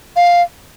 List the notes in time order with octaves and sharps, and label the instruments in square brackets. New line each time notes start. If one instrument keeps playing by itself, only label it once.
[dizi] F5